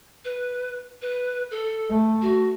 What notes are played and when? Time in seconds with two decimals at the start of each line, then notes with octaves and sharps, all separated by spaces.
0.25 B4
1.02 B4
1.51 A4
1.90 A3
2.22 F#4